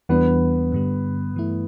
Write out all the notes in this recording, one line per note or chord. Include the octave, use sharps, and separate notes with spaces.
E2 E3 G3 B3 D4
G2 D3 G3
G2 E3 A3 E4